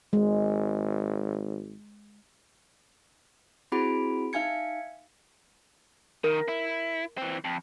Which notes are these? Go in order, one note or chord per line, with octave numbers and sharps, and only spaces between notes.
G#1 G#3
C4 E4 F#4 G#4 B5 D7
D#4 E5 F5 G#5 G#6 C#7
D#3 A#4
E4
E3 C4
F2